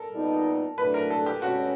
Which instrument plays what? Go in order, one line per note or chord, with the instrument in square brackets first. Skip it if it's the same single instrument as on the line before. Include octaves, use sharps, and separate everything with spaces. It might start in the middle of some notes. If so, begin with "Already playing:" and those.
Already playing: [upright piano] A4 A#4
[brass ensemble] A#2 G3 B3 D#4
[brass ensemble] A2 F#3 A3 D4 [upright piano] B4
[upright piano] A#4
A4
G4
[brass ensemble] B2 G#3 C#4 [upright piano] F#4